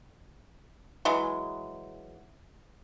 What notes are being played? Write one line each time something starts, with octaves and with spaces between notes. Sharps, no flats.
E3 F#3 G#3